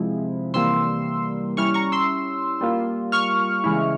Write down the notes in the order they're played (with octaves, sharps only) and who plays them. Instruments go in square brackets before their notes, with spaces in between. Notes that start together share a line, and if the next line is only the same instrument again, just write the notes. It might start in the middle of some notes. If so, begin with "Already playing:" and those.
Already playing: [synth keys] C3 F3 G#3 E4
C3 E3 G3 A#3 C6 E6
G3 C#4 E4 C#6 F6
A#5 C#6
C6 E6
G3 A#3 F4
C#6 F6
C#3 E3 G#3 E4